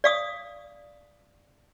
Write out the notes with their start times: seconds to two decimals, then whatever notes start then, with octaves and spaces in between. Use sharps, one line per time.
0.04 D5 F5 D#6